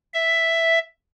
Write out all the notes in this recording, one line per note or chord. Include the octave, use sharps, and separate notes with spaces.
E5